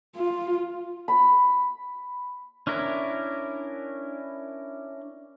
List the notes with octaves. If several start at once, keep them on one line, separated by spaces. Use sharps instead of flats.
F4
B5
C#4 D4 E4 A#4